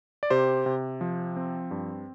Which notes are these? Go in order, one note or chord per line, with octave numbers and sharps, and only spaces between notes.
D5
C3 G4 C5
C3
F3
C4
G2